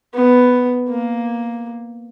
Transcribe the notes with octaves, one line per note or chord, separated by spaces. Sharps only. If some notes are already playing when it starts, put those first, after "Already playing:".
B3
A#3